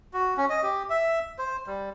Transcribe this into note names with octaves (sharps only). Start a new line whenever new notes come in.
F#4
C#4
D#5
G4
E5
C5
G3